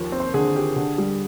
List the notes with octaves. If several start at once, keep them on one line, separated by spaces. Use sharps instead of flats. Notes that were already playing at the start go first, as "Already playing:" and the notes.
Already playing: D#2 F3
C4
C5
D3 G#4
G4
D3
G3